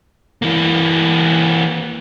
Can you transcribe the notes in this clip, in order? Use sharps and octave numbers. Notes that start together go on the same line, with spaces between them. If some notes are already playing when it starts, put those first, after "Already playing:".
E3 A#3